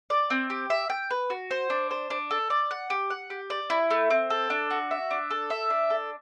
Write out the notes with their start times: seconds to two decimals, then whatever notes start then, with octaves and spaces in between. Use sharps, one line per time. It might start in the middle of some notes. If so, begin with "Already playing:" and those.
0.10 D5
0.30 C4
0.50 G4
0.70 E5
0.90 G5
1.10 B4
1.30 F#4
1.51 C5
1.70 D4
1.91 C5
2.10 D4
2.31 A4
2.50 D5
2.71 F#5
2.90 G4
3.10 F#5
3.30 G4
3.50 D5
3.70 E4
3.91 A3
4.10 C4
4.30 A4
4.50 D4
4.71 F#4
4.91 E5
5.11 D4
5.31 A4
5.50 E5
5.70 D4
5.90 A4